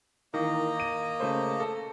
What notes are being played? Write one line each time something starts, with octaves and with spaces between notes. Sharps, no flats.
D#3 E3 A#3 D#5 A#5
D#7
C#3 A3 C5
A4